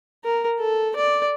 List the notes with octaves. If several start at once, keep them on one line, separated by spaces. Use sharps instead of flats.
A#4
A4
D5